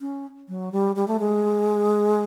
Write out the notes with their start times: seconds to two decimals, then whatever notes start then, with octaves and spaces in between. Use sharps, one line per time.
0.01 C#4
0.48 F#3
0.72 G3
0.96 G3
1.08 A3
1.20 G#3